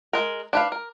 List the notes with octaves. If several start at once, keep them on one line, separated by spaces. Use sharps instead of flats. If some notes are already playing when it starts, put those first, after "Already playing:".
G#3 A#4
D4 B4 F5
A#4